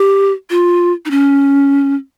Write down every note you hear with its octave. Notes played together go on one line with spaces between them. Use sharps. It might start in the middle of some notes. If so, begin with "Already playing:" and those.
Already playing: G4
F4
D#4
C#4